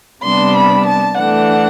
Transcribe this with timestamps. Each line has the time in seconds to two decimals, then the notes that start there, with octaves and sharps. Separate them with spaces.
0.22 C3 G3 B3 D4 C6
0.53 B5
0.85 A5
1.16 E3 A3 D4 F#5